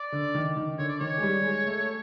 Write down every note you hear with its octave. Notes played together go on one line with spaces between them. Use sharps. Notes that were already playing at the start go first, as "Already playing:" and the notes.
Already playing: D5
D3
D#3
D#3
D3 C#5
D5
D#3 C#5
G#3
G3
G#3
A3